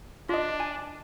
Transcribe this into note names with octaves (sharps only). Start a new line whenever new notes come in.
D4 F4 D#5
G#5